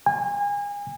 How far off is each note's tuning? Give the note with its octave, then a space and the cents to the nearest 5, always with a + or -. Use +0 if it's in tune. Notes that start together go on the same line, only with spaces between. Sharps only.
G#5 -30